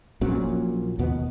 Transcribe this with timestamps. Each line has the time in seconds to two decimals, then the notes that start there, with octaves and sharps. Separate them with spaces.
0.21 A#1 A#2 F#3 C#4
0.99 D#2 B2 B3